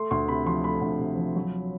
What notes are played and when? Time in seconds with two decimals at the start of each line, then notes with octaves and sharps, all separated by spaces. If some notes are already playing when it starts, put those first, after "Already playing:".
Already playing: A3 C6
0.11 D2 C6
0.28 C3 B5
0.46 F3 C6
0.64 A3 B5
0.81 D2
0.99 C3
1.17 F3
1.36 F#3